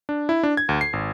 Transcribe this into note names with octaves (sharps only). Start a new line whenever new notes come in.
D4
E4
D4
G#6
D2
C7
G#1